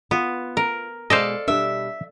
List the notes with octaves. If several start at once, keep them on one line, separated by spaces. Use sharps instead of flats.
B3 F4
A#4
B2 G#3 G#4 A4 C5 D5 D#5 F5
B2 G3 D4 E5